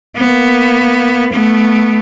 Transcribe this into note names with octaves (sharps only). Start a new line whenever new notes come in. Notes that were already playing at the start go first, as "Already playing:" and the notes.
A#3 B3
A3 B3